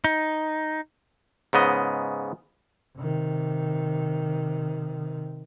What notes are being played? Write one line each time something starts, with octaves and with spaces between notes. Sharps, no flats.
D#4
G#2 C#3 B3 D#5
C3 D#3